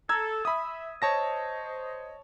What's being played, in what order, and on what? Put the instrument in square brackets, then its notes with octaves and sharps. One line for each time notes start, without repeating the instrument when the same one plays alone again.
[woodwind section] A4 [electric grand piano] A#5 E6 G#6
[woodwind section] E5 [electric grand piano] B5 D#6
[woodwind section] C5 D#5 [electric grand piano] C#5 A5 A#6